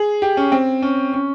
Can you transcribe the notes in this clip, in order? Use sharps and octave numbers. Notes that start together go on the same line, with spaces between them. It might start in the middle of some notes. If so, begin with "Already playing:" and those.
Already playing: G#4
G4
C#4
C4
C#4
C#4